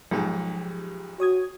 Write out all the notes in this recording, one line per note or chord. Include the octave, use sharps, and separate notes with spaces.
B1 G#2 F3 G4 G#4
F#4 C#5 D#6 G#6